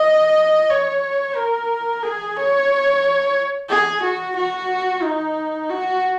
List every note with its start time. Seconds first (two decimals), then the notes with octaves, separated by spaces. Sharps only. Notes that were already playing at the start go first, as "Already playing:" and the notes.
Already playing: D#5
0.70 C#5
1.35 A#4
2.03 G#4
2.36 C#5
3.70 G#4
4.02 F#4
4.36 F#4
5.02 D#4
5.70 F#4